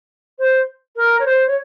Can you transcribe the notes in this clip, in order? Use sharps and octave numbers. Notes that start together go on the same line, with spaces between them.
C5
A#4
C#5
C5
C#5